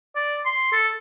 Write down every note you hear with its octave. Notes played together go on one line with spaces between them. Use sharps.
D5
C6
A4